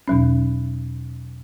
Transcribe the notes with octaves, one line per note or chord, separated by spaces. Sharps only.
E2 B2 F#3 C#4